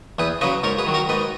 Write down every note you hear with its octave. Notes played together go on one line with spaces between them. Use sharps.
E2 G#4 B4
C#3 F#3 B4 D#5
G#2 A#4 C#5
G#4 B4
D#3 F#3
F#4 A#4
G#2 B4 D#5